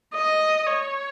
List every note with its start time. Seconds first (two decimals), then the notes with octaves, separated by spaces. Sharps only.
0.14 D#5
0.66 C#5